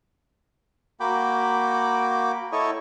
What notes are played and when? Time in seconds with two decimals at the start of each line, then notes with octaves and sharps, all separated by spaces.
1.00 A#3 F#4 G5 B5 D6
2.52 E4 A4 C#5 D#5 C#6